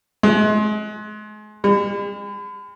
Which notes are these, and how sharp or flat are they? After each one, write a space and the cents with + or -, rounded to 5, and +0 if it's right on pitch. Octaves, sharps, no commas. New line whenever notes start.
G#3 +35
G#3 -45